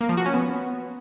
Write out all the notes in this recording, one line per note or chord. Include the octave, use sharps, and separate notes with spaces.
A#3
F3
F#4
C#4
B3